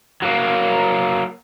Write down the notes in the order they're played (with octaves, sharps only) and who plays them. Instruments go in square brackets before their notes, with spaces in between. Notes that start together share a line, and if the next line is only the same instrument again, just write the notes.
[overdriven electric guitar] F#3 A#3